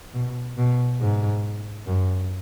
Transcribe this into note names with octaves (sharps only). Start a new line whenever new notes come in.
B2
B2
G#2
F#2